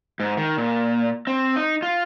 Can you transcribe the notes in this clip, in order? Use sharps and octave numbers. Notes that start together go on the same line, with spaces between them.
G#2
D#3
A#2
C4
D#4
F4